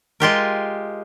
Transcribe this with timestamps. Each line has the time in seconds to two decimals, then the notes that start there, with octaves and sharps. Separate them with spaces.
0.20 G#3 F4 G4 A#4